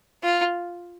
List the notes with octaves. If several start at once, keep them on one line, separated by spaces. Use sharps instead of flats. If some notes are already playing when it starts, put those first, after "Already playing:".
F4